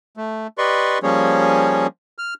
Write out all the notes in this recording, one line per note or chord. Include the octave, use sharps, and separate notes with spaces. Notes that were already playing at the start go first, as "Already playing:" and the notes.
A3
G4 B4 D5 D#5 C6 C#6
F3 G3 A#3 C#4 G#4 C#5
F6